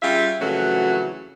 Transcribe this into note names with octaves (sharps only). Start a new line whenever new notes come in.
G3 C#4 F4 G#4 E5 F5
F2 C#3 E3 F#3 A3 F#4